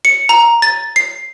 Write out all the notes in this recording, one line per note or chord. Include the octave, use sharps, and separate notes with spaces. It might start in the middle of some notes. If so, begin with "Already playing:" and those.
C#7
A#5
A6
C7